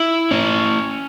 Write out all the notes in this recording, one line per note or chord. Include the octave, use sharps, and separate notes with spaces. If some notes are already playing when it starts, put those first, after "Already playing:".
Already playing: E4
C#4